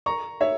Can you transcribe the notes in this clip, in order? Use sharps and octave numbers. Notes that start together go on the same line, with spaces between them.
A#5 C#6
C#5 E5